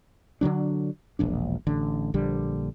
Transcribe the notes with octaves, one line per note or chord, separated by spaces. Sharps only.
D3 D#3 F#3 D4
E1 A#1 D4
A1 D3
A#1 D3 G3